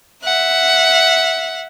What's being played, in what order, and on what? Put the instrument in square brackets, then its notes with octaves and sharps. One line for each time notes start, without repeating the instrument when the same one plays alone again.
[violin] E5 F#5